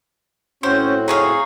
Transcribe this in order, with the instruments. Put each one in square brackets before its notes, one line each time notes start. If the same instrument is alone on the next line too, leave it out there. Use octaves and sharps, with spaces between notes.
[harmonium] A2 C4 F#4 [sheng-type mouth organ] C#4 [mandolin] C5
[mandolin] D#4 C#5 F5 [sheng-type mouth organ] G#4